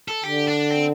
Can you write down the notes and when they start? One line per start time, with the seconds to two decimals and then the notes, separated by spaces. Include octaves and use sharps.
0.08 A4
0.24 D3 G4
0.47 D4
0.70 C4